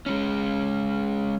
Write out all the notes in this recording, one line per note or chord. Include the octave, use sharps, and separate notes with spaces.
G#3 C#4